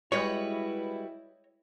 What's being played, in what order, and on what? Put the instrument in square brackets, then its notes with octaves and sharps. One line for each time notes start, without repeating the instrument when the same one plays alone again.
[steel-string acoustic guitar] G3 F#4 B4 [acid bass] G#3 [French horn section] E4 [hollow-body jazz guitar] C#5 D#5